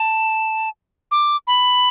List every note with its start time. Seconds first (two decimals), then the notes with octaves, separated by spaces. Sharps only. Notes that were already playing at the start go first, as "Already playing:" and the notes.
Already playing: A5
1.11 D6
1.47 B5